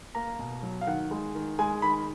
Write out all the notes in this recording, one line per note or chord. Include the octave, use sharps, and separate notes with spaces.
A#3 A#5
B2
F#3
F5
D#3 F#5
G#3
D#3
G#3 G#5
D#3 B5